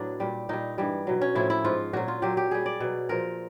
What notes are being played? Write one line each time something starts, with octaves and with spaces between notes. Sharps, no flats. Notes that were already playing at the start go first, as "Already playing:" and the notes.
Already playing: A2 F#3 B3 D4
A#2 G3
A#2 G3 D#4
G2 E3 G3
B2 F#3
C#4
A2 F3 E4
E4
G#2 F3 F4
A#2 F#3 F#4
F4
A#2 F#3 G4
G4
A#2 G3 G#4
D5
B2 F#3
A#2 F3 A#4